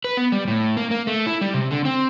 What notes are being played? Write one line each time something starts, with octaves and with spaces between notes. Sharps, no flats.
B4
B3
G3
A2
A#3
A#3
A3
E4
G3
C3
D3
C4